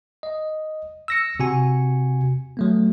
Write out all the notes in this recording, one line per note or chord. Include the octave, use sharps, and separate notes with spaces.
D#5
E6 A#6 C#7
C3 F#4 G#5 C#7
F#3 A3 B3